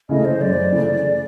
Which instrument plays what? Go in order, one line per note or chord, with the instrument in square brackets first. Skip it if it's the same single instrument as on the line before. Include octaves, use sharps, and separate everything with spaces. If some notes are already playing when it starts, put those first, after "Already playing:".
[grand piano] C#3 E3 A3 [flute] D#5
[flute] C5
[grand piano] F#2 [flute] D5
[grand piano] C#3 E3 A3